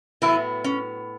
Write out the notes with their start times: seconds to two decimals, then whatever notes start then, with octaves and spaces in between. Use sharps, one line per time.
0.22 A2 E3 F#3 B3 E4
0.64 C#4